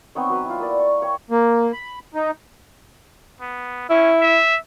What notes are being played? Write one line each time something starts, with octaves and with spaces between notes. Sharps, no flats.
B3 C4 D#4 C#5
F#3 B4
E4 F4
A#3 E4 D5
C#6
C#5 G5
A#3
B5
D#4
B3
C#4 E4
E5